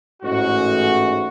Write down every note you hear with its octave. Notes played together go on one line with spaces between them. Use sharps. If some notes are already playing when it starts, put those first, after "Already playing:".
A1 G#2 F#4